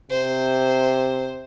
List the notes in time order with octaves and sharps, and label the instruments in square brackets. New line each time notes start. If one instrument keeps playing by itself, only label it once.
[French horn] C3 [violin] C5